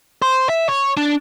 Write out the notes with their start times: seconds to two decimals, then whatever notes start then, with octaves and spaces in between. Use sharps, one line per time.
0.22 C5
0.49 E5
0.69 C#5
0.97 D4